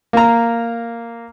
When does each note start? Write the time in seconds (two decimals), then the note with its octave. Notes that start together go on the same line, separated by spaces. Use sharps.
0.13 A#3 A#5